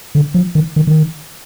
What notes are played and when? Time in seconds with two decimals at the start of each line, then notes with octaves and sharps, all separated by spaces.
0.15 D3
0.34 F3
0.55 D#3
0.76 D#3
0.87 D#3